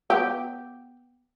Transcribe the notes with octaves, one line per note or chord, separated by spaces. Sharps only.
B3 G4